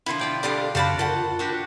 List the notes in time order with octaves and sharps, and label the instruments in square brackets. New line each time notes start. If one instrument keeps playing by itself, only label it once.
[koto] B2 D3 F3 [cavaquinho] E4 C6
[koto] F4 D5 G5
[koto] G3 D4 [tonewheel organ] G4 A4 B5 [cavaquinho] D5 F5 D#6
[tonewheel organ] F#2 C#3 [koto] F#4 C5 D5 [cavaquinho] F5 A5 B5
[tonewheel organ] F4 A#4 [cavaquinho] A4 F#5
[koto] D4 F#4 G4